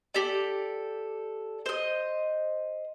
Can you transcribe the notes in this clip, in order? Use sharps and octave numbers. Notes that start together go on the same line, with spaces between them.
G4 A4 D5
C5 D#5